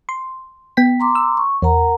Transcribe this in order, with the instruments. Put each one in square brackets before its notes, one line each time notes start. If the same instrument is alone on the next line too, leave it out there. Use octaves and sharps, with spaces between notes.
[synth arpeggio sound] C6
B3 G5 B6
[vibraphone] A#5 C6 D6
[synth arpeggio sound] E6
[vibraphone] C#6
[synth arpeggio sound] E2 [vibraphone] A#4 F#5 A#5